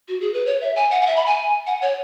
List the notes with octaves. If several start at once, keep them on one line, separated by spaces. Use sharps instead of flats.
F#4
G#4
B4
C#5
E5
G#5
F#5
F#5
E5
B5
G#5
F#5
C#5